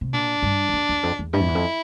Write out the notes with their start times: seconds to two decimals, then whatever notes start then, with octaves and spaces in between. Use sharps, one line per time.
0.01 C3
0.13 A#2 D4
0.43 G2
0.69 E2
0.73 F2
0.89 E2
1.03 F2
1.19 E2
1.33 G2 E4
1.40 F2
1.48 E2
1.55 F2